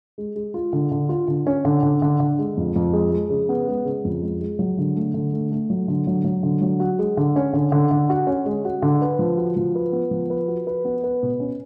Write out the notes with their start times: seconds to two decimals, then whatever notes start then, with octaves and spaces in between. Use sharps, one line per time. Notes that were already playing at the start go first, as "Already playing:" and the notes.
0.18 G#3
0.36 G#3
0.54 F4
0.73 D3
0.92 D3
1.09 F4
1.28 D3
1.47 C#4
1.65 D3
1.83 D3
2.02 D3
2.20 D3
2.39 G#3
2.57 F2
2.76 F2
2.93 G#3
3.12 G#3
3.30 C#3
3.49 B3
3.68 G#3
3.85 C#3
4.05 F2
4.22 G#3
4.41 G#3
4.59 F#3
4.78 D3
4.95 A3
5.14 D3
5.33 A3
5.52 A3
5.70 F#3
5.88 D3
6.07 F#3
6.24 F#3
6.43 D3
6.62 F#3
6.80 F#4
6.99 G#3
7.17 D3
7.36 C#4
7.53 D3
7.72 D3
7.91 D3
8.09 F#4
8.27 C#4
8.46 G#3
8.65 F#4
8.82 D3
9.02 B4
9.19 F3
9.37 F#4
9.56 F3
9.75 B4
9.93 B3
10.11 F3
10.30 B4
10.48 F#4
10.67 B4
10.85 B3
11.04 B4
11.23 B2
11.40 C#4